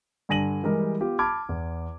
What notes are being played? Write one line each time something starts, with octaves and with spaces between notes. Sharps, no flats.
G2 D3 G#5 A#6 D#7 F#7
E3 G3 G#3 G4 A#4
B3 F4 G4
A5 B5 D6 F6 G#6
E2